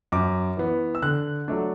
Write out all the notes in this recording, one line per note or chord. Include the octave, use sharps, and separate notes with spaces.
F#2 D6
E3 B3
E6
D3 F#6
F#3 A3 D4